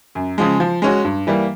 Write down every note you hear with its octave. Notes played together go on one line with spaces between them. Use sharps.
F#2
C#3 F3 G#3
F3
G#3 C#4 F#4
G2
E3 G3 A#3